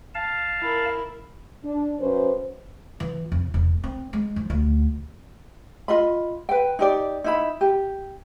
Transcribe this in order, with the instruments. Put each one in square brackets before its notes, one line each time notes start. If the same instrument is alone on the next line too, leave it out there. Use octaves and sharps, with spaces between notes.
[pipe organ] F5 A5
[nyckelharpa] E4 A#4
[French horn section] D4
F#2 C#4 B4 C5
[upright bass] E3
F2
E1
C4
G#3
F3
D2
[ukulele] F4 D#5 B5
B4 G5
D#4 G4 D5
D#4 E4 B5
G4